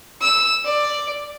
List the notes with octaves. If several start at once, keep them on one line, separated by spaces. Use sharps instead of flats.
E6
D5